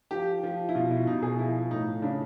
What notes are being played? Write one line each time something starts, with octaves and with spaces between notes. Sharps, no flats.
F3 G4
F3
E4
B2 F4
E4
B2 D#4
G#4
F3 E4
A2 D#4
C#3 D4